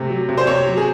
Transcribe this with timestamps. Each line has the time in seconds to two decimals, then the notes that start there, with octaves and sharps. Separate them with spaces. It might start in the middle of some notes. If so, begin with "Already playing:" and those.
Already playing: C3 A3
0.10 F#3
0.29 C3
0.37 C5
0.47 C3 C#5
0.66 F#3
0.77 G#4